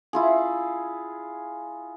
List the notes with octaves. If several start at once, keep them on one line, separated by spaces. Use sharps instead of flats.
E4 F4 G#4